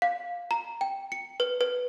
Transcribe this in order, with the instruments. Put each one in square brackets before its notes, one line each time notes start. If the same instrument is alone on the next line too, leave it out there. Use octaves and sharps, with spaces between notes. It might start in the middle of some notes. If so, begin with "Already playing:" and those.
[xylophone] F5
A#5
G5
C#7
B4
B4